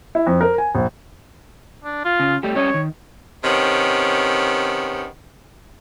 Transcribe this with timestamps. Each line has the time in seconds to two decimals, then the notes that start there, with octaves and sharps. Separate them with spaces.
0.15 E4
0.27 F2
0.41 A#4
0.58 G#5
0.75 A#1
1.84 D4
2.05 F4
2.20 C#3
2.43 G3 A3 G4
2.55 G3 C#4 C#5 D#5
2.74 D#3
3.43 C3 D#3 B3 C#4